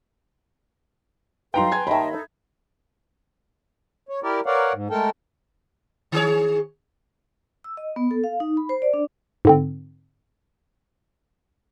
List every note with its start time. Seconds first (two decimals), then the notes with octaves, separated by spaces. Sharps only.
1.54 F#3 D#4 A4 B4 F5 G5 A#5 C6
1.72 B4 G#5 G#6
1.87 D#2 D#3 D#5 E5 A5 B5
2.12 D#4 A4
4.09 C#5
4.23 E4 G4 A#4 D5
4.46 A#4 B4 C#5 D5 F5 F#5
4.73 G#2
4.90 G#3 A3 A4 A#4 G5 A5
6.12 D#3 G#4 C#5
7.64 E6
7.77 D#5
7.96 B3
8.11 A4
8.24 F5
8.40 D#4
8.57 B5
8.69 C5
8.82 D5
8.94 D4
9.45 G#2 D3 C4